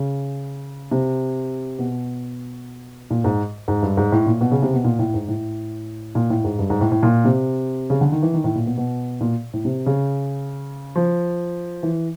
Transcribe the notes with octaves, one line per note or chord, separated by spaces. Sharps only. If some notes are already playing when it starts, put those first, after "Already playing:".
Already playing: C#3
C3
B2
A#2
G#2
G#2
G2
G#2
A2
A#2
B2
C#3
C3
B2
A#2
A2
G#2
A2
A#2
A2
G#2
G2
G#2
A2
A2
A#2
C3
C#3
D3
D#3
E3
D#3
A2
A#2
B2
B2
A#2
A2
C3
C#3
F3
E3